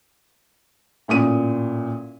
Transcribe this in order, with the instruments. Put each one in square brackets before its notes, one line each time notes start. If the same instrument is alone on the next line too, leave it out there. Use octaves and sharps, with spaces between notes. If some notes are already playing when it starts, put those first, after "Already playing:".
[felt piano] A1 A#2 D#6 D#7